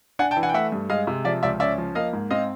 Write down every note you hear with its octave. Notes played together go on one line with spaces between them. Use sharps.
D4 F#5 G#5
G5 A5
E3
F#5 G#5
G5
A3 E5 F#5
G2
G#3 D#5 F5
C3
F3 D5 E5
C#2 D5 E5
C#4 D5 E5
F3
A#3 D#5 F5
G#2
C4 D#5 F5